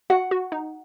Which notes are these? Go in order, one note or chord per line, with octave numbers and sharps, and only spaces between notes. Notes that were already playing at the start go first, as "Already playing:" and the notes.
F#4 F#5
F#4
D#4